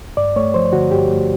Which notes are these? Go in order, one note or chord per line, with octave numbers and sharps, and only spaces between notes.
G2 D5
A3 C#5
F3 C5
D3 F#4
G2 G4
A3